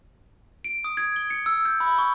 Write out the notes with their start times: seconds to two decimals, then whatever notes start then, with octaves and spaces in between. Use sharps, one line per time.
0.64 D7
0.84 D#6
0.97 G#6
1.16 G7
1.30 C#7
1.46 E6
1.65 G6
1.80 B5
1.98 C#6